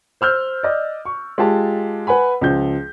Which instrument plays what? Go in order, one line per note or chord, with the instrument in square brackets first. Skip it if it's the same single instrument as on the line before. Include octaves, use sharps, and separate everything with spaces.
[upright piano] C5 E6 F6 G6
D5 D#5
C#6
G#3 F4 G4 A5
B4 F#5 G#5 B5
C#2 F3 G6